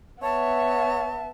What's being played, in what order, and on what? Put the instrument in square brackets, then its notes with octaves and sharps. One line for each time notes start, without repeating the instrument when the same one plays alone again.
[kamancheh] B3 E5 [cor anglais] C#5 [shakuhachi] A5